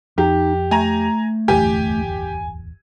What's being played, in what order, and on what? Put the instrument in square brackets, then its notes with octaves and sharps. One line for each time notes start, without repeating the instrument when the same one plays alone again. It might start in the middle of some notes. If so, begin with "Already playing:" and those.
[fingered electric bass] F2 [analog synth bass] D#4 [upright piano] G4
[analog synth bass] A3 [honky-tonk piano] G#5 A#5
[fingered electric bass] D1 G1 E2 [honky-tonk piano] G4 [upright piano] G#5